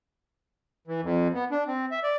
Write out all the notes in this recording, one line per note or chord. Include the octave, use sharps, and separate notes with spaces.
E3
F2
B3
D4
C4
E5
D5